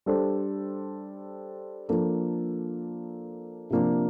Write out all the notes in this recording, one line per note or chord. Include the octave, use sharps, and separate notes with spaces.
G3 D4 A4 C5
F3 A#3 D4 A4
C3 F3 A#3 D4